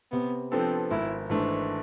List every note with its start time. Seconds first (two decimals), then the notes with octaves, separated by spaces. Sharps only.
0.12 C3 B3
0.52 F3 B3 C4 D4 A4
0.91 G#1 E4
1.30 G#2 E3 A3 D4